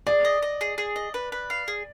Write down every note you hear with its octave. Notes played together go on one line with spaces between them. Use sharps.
G#4 D5
D#5
D#5
G#4
G#4
D#5
B4
B4
F5
G#4